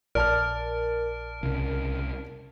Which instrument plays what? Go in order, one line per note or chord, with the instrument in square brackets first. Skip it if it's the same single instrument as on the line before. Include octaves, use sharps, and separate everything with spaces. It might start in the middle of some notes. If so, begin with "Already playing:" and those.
[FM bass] A#1 [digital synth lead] A#4 [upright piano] D5 A5 F6
[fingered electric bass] C2 C#3